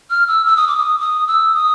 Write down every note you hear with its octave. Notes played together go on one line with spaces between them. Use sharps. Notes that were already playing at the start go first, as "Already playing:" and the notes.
F6
E6
E6
D#6
D6
D#6
D#6
E6
D#6